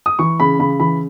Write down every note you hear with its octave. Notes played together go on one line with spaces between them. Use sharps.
D#6
E3 C#6
C#3 B5
C#3 B5
E3 B5